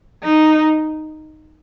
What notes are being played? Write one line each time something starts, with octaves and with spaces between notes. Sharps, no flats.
D#4